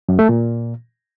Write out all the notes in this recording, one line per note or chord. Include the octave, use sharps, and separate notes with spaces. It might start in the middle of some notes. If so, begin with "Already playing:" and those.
F#2
A3
A#2